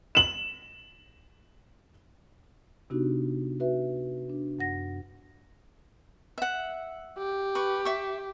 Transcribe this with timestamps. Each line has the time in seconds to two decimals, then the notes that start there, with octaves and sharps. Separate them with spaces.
0.15 E7 F#7
2.90 C3 B3 D4 D#4 F#4 G4
3.60 F#4 B4 E5
4.30 D4
4.59 F#2 F#5 A#6
6.38 E5 F#5
7.18 G4
7.55 B4 C#6
7.85 E5 C#6